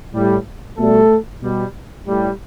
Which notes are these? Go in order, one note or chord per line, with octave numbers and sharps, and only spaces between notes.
A2 G3
B2 G3 A3 A4
B2 G3
A2 G3